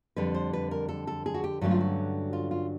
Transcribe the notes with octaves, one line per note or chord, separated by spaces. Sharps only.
F2 D3 G3 B4
C5
B4
A#4
A4
A4
G#4
F#4
G4
G2 D3 F#3 A3 C#4 F#4
F4
F#4
F4
F4